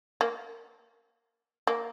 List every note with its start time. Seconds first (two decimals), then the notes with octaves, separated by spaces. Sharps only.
0.21 A#3
1.67 A#3